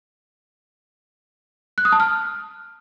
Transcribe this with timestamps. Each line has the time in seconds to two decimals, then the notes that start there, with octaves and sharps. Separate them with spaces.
1.78 F#6
1.85 D#6
1.92 A5
2.00 F6